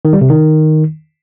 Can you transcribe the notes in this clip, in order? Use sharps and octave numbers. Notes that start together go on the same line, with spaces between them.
D#3
G3
C3
D#3